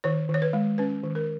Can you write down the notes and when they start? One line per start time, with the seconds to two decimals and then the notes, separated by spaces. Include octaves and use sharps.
0.04 D#3 C#5
0.29 D#3
0.34 C#5
0.42 B4
0.53 G#3
0.78 C#4 B4
1.04 D#3
1.15 A#4